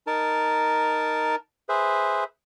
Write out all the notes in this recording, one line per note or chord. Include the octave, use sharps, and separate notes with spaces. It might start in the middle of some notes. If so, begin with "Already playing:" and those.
D#4 A#4 A5
G#4 B4 C5 E5